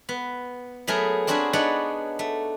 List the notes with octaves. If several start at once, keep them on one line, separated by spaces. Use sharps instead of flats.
B3
F#3 A3 B3 G#4 A#4
C4 D4 F#4 G#4 A#4 B4
B3 D4 D#4 C#5 D5 F#5
A3